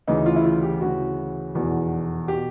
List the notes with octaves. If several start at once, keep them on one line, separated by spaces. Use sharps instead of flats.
D2 C#3 E3 D#4
F4
E4
F4
G4
D2 C#3 E3 F#4
F1 E2 B2
B2 G4